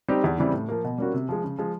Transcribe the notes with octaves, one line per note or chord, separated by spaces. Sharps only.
G3 C4 D#4 G4
E2
C#3 E3 G3 C4
A2
F3 A#3
B2
G3 A#3 C#4 F#4
C3
F3 G#3
C#3
F3 G#3